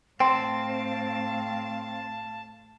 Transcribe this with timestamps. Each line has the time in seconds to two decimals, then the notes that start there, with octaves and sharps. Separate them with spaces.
0.20 A2 C4 F5 G5 A5 C6